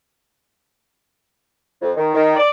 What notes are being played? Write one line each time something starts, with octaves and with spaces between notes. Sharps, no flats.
F2
D#3
D#3
D5